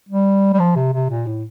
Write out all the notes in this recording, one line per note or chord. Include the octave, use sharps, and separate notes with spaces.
G3
G3
F3
C3
C3
A#2
A2